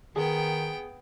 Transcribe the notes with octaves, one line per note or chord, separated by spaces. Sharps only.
D#3 B3 G#4 G5